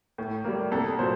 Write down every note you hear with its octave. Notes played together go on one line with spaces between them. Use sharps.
A2
G3 A#3
C2 A4
A#2 F#3 C5